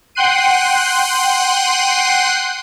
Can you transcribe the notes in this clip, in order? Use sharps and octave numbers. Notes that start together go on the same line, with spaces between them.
F#5 G5 C6 F#6 C7 D#7